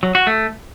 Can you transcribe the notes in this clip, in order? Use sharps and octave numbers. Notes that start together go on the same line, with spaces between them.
F#3
F#4
A3